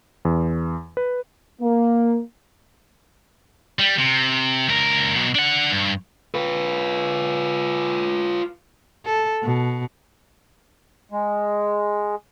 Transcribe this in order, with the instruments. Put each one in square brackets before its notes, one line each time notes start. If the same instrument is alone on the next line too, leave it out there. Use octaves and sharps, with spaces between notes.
[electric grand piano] E2
B4
[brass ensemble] A#3
[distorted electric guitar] G3
C3
C#2 A#4
B2 F#3
D4 F#5
G2
[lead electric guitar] F4 B4
[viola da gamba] A4
B2
[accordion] G#3